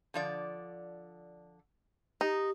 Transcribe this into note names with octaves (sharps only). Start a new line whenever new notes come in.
D3 F3 D5
D#4 G4